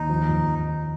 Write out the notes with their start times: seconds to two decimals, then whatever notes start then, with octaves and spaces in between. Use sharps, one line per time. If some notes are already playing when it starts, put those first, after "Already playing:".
Already playing: D#2 D#4
0.09 F3
0.29 F2